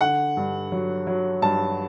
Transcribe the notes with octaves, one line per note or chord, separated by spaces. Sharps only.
D3 F#5
G2
F#3
F#3
G2 A5